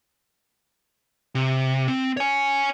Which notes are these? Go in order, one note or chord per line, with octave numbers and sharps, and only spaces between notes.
C3
C4
C#5 G#5